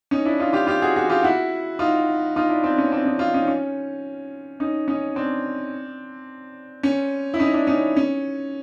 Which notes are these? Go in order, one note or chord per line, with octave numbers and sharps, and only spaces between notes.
C#4 D#4
D4 E4
D#4 F4
F4 G4
F4 G4
F#4 G#4
F#4 G#4
F4 G4
E4 F#4
D#4 F4
D#4 F4
D4 E4
C4 D4
C#4
C4 D4
C#4 D#4
D#4 F4
C#4 D#4
C#4
C#4 D#4
C#4 D#4
C4 D4
C#4
E4
C#4 D#4
D4 E4
C#4 D#4
C#4